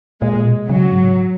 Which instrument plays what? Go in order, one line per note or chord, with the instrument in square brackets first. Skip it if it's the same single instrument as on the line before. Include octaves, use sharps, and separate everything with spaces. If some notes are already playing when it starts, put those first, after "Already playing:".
[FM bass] A#2 [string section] G#3
[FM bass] B2
[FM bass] C#3 [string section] F#3
[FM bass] G#2